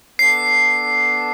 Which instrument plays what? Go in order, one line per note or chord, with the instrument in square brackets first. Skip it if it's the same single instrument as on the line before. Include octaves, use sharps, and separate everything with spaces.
[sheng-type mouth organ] B3 D4 A4 [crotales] C7